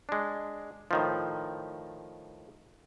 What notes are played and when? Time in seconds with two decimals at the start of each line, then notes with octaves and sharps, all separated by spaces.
0.09 G#3 D4
0.91 A2 D#3 F3